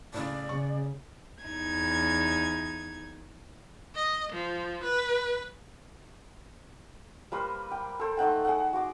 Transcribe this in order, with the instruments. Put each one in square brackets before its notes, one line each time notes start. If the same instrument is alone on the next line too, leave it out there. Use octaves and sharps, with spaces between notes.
[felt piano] A2 C#3 [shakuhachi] D5
[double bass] C#3 [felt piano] C#6
[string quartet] E2 D#4 G#6
[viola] D#5
F3
B4
[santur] G3 A#3 B4 C5
G5
A4 C5
A3 D#4 F#5 G5
G#4 F#5
F#4 D6